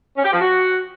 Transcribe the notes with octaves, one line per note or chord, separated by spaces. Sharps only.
C#4
G4
F3
F#4